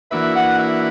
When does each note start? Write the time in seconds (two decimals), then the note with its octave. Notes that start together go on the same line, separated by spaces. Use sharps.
0.11 E3 A#3 D4 F#4 B4 E5
0.35 F#5
0.59 E5